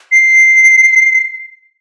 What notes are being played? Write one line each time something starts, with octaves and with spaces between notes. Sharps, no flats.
C7